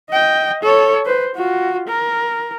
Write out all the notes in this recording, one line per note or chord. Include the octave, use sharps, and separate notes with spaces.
D#5 G5
A4 C#5
B4 C5
F4 F#4
A#4